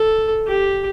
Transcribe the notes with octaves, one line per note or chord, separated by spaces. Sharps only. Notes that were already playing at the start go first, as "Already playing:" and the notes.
Already playing: A4
G4